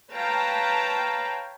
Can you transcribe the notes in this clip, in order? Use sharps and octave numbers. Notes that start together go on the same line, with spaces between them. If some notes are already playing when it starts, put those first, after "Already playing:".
B4 C#5 F5 G5 A5 A#5